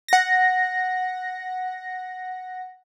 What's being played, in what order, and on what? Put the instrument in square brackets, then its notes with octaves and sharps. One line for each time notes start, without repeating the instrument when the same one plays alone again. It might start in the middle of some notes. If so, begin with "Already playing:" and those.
[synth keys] F#5 A#6